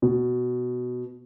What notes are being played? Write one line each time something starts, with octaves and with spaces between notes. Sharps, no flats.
B2